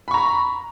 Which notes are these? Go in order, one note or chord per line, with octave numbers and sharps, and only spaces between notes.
A#5 B5 C#6